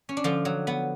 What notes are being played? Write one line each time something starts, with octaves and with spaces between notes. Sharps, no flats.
C#4
D4
D3 F3 F4
F#3
B3